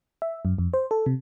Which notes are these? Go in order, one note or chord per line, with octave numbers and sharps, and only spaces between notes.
E5
F#2
F2
C5
A4
C3